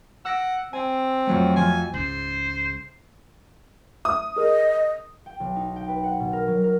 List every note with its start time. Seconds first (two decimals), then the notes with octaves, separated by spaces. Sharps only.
0.25 F#5 E6 A#6 D7
0.73 C4 G#5
1.27 F2 F#3 A3
1.56 F3 G#5
1.93 C#2 G#2 C5
4.05 E5 D#6
4.36 G#4 A#4 D#5
5.26 G5
5.40 B1
5.56 D#4
5.76 G5
5.88 B4
6.04 F#5
6.20 B2
6.33 A#4
6.48 F#3
6.64 A#4